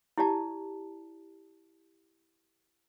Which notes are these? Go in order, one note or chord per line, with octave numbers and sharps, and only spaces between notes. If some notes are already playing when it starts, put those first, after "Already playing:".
E4 G4 D5 A5